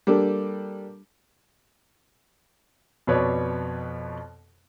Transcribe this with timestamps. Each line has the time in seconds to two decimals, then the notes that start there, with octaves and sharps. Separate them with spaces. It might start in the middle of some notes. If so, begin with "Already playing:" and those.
0.07 G3 A#3 D4 G4 A4
3.07 F2 B2 B4 C#5 D5